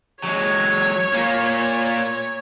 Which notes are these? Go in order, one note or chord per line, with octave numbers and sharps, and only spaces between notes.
F#3 G#3 C#5
A#2 A#3